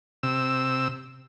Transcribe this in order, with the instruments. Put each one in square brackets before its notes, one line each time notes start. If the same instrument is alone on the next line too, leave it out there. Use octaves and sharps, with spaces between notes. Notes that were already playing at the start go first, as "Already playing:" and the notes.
[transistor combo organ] C3 E6